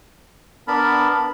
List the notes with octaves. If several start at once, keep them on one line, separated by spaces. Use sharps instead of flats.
B3 D4 A#4 A5 B5